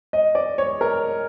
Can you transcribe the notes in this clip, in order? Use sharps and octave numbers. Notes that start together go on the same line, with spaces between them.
D#5
D5
C#5
A#4